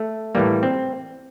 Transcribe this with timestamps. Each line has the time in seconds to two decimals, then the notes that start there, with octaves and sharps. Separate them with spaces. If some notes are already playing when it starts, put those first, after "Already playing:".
Already playing: A3
0.35 A2 E3 G3 A#3
0.63 C4